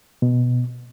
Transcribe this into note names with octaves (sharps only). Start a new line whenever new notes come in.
B2